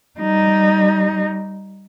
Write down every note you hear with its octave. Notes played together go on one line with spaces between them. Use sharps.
G3 D#4